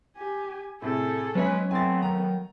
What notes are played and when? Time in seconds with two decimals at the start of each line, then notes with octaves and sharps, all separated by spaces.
0.17 G4 G#5
0.82 A2 C3 G#4 A4
1.35 F#3 G#3 B3 C#4 B4 C#5 E5 G#5
1.71 A3 B3 C4 G#5 A6
2.02 D#3 A#5